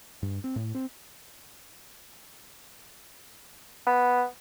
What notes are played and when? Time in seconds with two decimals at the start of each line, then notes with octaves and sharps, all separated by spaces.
0.23 G2
0.44 C4
0.56 A2
0.75 C4
3.87 B3